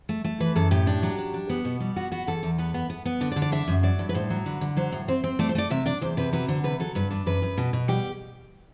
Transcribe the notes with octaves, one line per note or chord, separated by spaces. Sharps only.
A3
A3
E3 B4
F#2 A4
A2 G4
D4
F#3
D4
D4
B3
B2
G3
B3 F#4
B3 F#4
E2 A4
E2
B3 B4
B3
B3
B3
D3
D5
D3
D5
D4 E5
F#2
F#3 D5
G2
B4
A2 C5
F#3
D3 B4
D3
F#3 C5
A2
C4 C5
C4
A3 D5
C5
A3 D5
C3 E5
D4 D5
E2 C5
C3 B4
F#3 B4
D3 C5
C3 B4
F#3 A4
G2 B4
D4 B4
F#2 B4
F#2
B2
B2
G3 G4